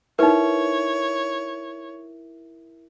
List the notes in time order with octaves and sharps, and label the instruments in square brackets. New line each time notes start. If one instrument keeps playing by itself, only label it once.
[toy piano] D#4 B4 [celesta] E4 A#4 E5 [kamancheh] C#5